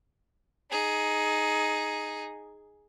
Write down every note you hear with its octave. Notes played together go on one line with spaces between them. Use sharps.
D#4 G#4